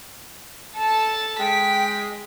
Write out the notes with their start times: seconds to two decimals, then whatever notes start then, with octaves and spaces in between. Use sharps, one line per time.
0.77 A4 A5
1.39 G#3 G5 B6